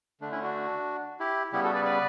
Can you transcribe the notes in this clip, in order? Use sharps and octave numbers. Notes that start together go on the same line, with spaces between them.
D3 A3 D4
C#4 E4
D4 F#4
E4 G4
C#3 G3 B3 E4 G4
F#4 A4
B4 D5
B4 D5